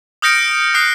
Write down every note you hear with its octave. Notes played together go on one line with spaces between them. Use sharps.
D#6 F6 G6 A#6 C#7 D7
D#6 F#6 C7 C#7